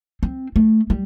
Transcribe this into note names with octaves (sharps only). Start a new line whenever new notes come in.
C4
A3
G3